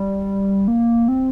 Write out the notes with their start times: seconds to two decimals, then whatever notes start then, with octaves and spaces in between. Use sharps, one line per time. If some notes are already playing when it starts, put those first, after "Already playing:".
Already playing: G3
0.68 A#3
1.08 C4